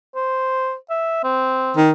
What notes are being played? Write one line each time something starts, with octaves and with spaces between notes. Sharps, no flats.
C5
E5
C4
D#3